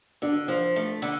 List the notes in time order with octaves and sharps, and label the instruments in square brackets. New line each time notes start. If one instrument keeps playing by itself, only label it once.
[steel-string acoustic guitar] D3 [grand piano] D4
[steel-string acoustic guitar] F3
A3
D3